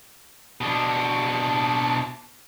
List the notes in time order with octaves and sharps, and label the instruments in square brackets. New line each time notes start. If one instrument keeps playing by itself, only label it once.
[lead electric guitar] B2 D4